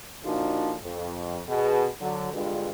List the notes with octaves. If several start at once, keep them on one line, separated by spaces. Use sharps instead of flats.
A#2 F3 D4 D#4 F#4 A4
F2
B2 G#4
D3 F#3
E2 G2 D3 G#3 F4 B4